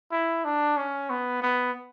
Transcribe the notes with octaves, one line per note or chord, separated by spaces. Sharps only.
E4
D4
C#4
B3
B3